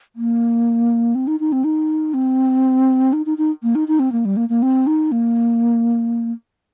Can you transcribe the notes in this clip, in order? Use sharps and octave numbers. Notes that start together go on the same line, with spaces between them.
A#3
C4
D#4
D#4
C4
D#4
C4
D#4
D#4
D#4
A#3
D#4
D#4
C4
A#3
G3
A#3
A#3
C4
D#4
A#3